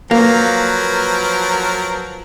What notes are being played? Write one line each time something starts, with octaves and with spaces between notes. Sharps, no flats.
F3 F#3 A#3 A#4 B4